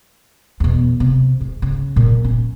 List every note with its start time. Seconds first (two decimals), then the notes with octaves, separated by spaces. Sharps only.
0.60 E2 B2
1.00 C3
1.41 G#2
1.62 C#3
1.96 C#2 A#2
2.24 C#4